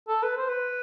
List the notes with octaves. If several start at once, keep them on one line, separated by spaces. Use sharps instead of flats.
A4
B4
C5
B4